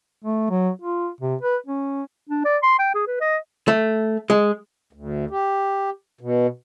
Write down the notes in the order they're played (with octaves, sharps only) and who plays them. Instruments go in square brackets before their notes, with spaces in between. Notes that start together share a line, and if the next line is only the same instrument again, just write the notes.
[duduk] A3
F#3
F4
C3
B4
C#4
[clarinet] D4
D5
C6
G5
G#4
B4
D#5
[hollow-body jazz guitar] A3
G#3
[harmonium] D2
G4
B2